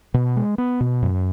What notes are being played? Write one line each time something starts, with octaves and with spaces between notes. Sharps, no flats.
B2
G#3
B3
B2
F#2